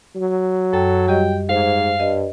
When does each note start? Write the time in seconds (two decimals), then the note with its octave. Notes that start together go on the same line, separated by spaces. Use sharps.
0.15 F#3
0.73 F#2 A4 G5
1.08 G3 G4 D#5 G5
1.49 G#2 C5 F5
2.00 G2 D#5